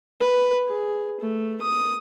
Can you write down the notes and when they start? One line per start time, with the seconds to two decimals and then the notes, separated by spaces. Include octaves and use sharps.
0.21 B4
0.68 G#4
1.21 A3
1.62 D#6